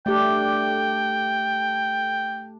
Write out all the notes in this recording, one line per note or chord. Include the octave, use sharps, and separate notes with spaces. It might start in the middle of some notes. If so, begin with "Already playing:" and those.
A3 D4 G4 D5 G5